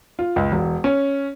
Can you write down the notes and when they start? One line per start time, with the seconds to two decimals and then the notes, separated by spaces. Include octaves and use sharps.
0.19 F4
0.36 C#2
0.52 E1
0.84 C#4